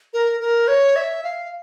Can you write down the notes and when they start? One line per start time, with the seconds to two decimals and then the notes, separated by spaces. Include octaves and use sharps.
0.13 A#4
0.41 A#4
0.68 C#5
0.96 E5
1.24 F5